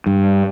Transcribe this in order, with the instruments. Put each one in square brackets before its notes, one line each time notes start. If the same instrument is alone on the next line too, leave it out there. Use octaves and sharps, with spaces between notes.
[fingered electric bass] G2